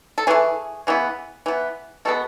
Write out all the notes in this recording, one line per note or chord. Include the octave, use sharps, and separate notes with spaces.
A4
E3 A3 G#4
C#3 E3 B3
E3 B3
B2 G#3 B3 A4